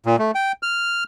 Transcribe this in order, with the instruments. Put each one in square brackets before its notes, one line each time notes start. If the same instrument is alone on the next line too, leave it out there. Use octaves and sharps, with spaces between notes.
[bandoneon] A#2
A3
G5
F6